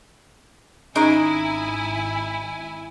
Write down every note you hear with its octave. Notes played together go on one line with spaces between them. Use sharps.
G#1 C#4 D#4 E4 G#4 A#4 D#5 G#5